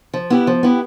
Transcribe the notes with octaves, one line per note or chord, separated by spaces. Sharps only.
F3
B3 E4 G4
F3
B3 E4 G4